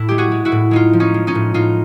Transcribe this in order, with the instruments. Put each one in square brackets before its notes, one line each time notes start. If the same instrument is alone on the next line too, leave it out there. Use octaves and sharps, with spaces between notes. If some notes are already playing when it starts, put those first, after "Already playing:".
Already playing: [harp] A2 E4
G#3 G4
F#4 G#4
G#3
E4 F#4
A2
G#3 D#4 F4
F3
C#4 D#4
G#3
C#4 D#4
A2
A2 D#4 F4